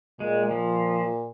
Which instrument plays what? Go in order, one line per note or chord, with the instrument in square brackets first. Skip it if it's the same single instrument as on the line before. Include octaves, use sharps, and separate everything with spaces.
[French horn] A#2 [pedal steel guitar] G#3
[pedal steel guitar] F3